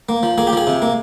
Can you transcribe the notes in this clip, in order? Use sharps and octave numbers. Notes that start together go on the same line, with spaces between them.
A#3
F3
A#3 G#4
G4
F3 G#4
C3
A#3